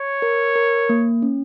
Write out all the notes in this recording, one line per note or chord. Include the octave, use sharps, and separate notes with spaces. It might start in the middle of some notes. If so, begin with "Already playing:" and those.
Already playing: C#5
A#4
A#4
A#3
C#4